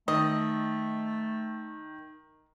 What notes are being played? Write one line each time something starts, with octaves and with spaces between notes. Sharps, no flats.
D#3 A3 D#5